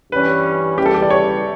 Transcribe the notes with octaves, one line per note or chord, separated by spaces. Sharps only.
G2 E3 G3 C#4 B4
E2 C#3 E3 G3 G4
A4
G4
D5
C#5